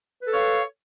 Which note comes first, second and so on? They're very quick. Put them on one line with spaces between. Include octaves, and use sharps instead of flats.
B4 A4 C#5 F5